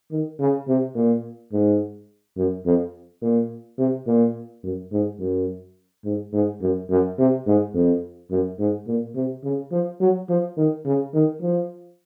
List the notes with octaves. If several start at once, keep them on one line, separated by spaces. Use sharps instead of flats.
D#3
C#3
C3
A#2
G#2
F#2
F2
A#2
C3
A#2
F#2
G#2
F#2
G#2
G#2
F#2
F#2
C3
G#2
F2
F#2
G#2
A#2
C3
C#3
F3
F#3
F3
D#3
C#3
D#3
F3